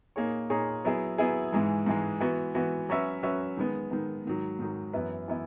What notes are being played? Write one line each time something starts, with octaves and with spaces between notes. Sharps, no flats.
A#2 A#3 D#4 G#4 C#5
A#2 A#3 D#4 G#4 C#5
F#3 B3 E4 G#4
F#3 B3 E4 G#4
G#2 E3 G#3
G#2 E3 G#3
E3 B3 F#4
E3 B3 F#4
F#3 C#4 F#4 B4 E5
F#3 C#4 F#4 B4 E5
D#3 G#3 B3
D#3 G#3 B3
G#2 D#3 F#3
G#2 D#3 F#3
F#2 E3 B3 E4 B4
E3 B3 E4